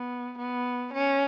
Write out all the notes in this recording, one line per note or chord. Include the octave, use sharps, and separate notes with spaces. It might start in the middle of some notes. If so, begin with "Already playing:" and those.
Already playing: B3
B3
C#4